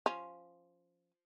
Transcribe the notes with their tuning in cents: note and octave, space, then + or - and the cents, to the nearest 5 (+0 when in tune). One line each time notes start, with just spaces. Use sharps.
F3 +0 C#4 +0 F4 +0